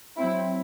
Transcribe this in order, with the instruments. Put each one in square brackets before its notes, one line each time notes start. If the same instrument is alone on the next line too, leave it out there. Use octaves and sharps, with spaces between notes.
[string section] F#3 C4 E4